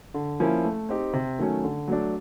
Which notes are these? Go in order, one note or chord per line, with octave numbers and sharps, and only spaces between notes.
D3
F3 A#3 C#4 E4
A3
C4 D#4 G4
C3
D#3 F#3 A3 C#4
D3
F#3 A3 D4